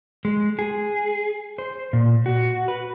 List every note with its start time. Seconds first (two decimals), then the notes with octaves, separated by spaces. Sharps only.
0.25 G#3
0.59 G#4
1.58 C5
1.93 A#2
2.26 F#4
2.68 B4